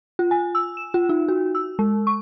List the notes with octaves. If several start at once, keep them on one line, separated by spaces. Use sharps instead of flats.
F4
G#5
E6
E7
F4
D#4
F#4
E6
G#3
C#6